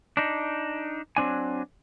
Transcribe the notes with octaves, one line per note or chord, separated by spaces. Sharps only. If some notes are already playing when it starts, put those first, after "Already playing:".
D4 D#4
F#3 C4 D4 G#5